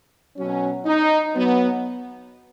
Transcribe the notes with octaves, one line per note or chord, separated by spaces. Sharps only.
B2 F#3 C#4
D#4
F#3 B3